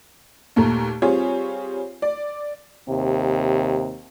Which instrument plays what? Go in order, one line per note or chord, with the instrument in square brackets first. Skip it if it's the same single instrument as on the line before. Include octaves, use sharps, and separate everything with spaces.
[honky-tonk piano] D#2 A#2 A3 A#5
G3 C4 F4 G#4 C#5
D5
[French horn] D#2 [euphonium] C3